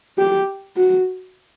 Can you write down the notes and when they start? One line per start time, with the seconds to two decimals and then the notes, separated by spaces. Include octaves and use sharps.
0.18 G4
0.76 F#4